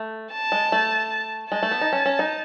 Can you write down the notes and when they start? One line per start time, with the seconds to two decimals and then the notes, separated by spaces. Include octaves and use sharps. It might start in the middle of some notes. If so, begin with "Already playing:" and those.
Already playing: A3
0.33 A5
0.52 G#3
0.72 A3
1.52 G#3 A5
1.63 A3
1.71 B3
1.81 D#4
1.93 C#4
2.06 C#4
2.19 D#4